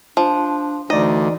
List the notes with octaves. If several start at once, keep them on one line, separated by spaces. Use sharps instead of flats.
F3 D4
D2 E3 D#4 D5 D#5